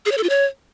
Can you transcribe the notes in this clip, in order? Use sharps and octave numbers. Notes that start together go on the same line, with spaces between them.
G#4
C#5
A4
F4
C#5